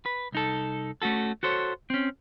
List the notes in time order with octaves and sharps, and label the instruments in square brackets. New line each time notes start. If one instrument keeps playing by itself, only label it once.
[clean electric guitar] B4
C2 D#4 A4
A3 C#4 F#4 A4
F#4 A4 C5 C#5
C4 C#4